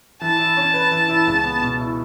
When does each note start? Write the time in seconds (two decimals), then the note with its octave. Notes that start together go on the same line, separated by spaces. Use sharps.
0.21 E3 A5
0.39 E4
0.57 C#4
0.74 B4
0.91 E3
1.09 E4
1.27 C#2
1.44 B3
1.62 B2
1.79 E4